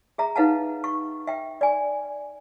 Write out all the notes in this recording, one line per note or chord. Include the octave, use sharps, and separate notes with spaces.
G#4 E5 A#5
D#4 B4 F5 F#5 A5
C#6
E5 G5
D5 G#5